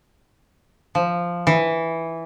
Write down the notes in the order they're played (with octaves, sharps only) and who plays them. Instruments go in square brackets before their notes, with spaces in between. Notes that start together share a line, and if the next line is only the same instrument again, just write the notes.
[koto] F3
E3